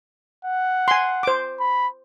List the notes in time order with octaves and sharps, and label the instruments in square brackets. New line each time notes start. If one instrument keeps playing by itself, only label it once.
[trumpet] F#5
[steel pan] G#5 C6
C5 D6
[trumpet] B5